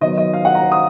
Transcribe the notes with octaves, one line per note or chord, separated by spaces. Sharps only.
D#3 F#3 B3 D#5
D#5
F5
F#5
A#5
D#6